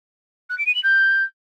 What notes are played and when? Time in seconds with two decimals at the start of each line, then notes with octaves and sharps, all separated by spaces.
0.50 F#6
0.58 D7
0.67 D#7
0.75 F#7
0.83 G6